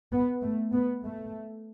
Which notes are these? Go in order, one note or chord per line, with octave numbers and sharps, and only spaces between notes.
B3
A3
B3
A3